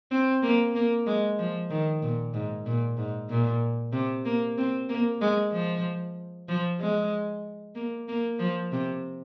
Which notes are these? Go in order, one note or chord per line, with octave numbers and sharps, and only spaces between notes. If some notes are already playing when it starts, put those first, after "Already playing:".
C4
A#3
A#3
G#3
F3
D#3
A#2
G#2
A#2
G#2
A#2
C3
A#3
C4
A#3
G#3
F3
F3
G#3
A#3
A#3
F3
C3